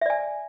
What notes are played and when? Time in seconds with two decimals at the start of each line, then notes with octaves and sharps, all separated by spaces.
0.02 E5
0.06 D5
0.10 G#5